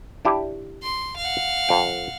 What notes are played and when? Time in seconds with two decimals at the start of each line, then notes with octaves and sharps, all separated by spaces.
0.25 D4 E4 G4
0.83 C6
1.18 F5 F#5
1.69 F2 G5